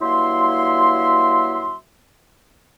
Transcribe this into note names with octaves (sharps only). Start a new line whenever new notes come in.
G2 F#3 A#3 E4 E5 C6